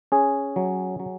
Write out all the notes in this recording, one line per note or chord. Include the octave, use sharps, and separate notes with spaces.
C#4 G#4
F#3
F#3